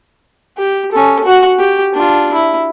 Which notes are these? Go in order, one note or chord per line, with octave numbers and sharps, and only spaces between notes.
G4
C#4 A4
F#4 F#5
G4
D4 F4
E4